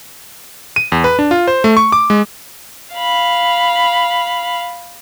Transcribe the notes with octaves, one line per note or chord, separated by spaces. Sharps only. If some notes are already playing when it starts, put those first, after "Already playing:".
D#7
E2
B4
D4
F4
C5
A3
C#6
D6
G#3
F5 B5